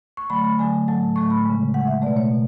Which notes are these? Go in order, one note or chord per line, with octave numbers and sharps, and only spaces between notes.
C#6
D3 F#3 A3 B5
B5
D3 F#3 A3 G#5
A2 F#3 A3 A5
A2 F#3 A3 C#6
B5
C#3 G#3
C#3 G#3 F#5
E5
B2 A3 D5
C#5
B2